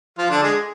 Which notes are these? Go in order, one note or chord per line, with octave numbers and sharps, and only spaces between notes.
F3 F4
D3 D4
G#3 G#4